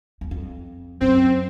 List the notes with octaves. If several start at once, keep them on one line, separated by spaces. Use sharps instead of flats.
E2
F2
F#2 C4